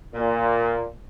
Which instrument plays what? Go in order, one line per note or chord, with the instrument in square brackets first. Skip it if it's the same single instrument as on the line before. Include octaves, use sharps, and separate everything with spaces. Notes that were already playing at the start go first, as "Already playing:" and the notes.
[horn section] A#2